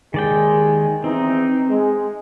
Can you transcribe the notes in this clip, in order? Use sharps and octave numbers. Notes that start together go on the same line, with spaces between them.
D#2 D#3 G#3 D5 G5
E2 E3 C4 D#4
G#3